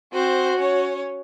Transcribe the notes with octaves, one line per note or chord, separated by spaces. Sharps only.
C4 F#4 C5
C#4 C#5